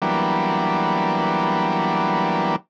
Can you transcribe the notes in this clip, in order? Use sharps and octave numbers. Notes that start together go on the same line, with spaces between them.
E3 F#3 G3 A#3 B3 D4